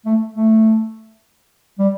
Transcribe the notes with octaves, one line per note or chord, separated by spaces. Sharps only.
A3
A3
G3